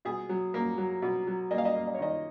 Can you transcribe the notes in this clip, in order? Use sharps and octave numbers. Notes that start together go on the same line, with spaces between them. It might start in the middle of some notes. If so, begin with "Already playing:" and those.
B2 G#4
F#3
A#3
F#3
B2
F#3
A#3 D#5
F5
D#5
A#3
D#5
C#5
D#3 D#5